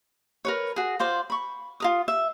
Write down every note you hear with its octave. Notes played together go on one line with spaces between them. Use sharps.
A#4 B4 C#5
F#4 G#4
F4 C5 D5
B5 C#6
F4 A#4 D#6
E5